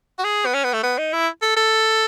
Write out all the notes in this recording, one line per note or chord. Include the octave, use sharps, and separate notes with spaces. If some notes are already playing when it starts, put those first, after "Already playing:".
F#4
G#4
B3
C#4
B3
A3
B3
D#4
E4
A4
A4